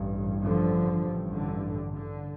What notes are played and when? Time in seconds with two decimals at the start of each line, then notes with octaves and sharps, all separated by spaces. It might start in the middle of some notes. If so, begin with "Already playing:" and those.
Already playing: A1 G2
0.42 D3 F3
1.03 A1 G2
1.33 D3
1.95 D3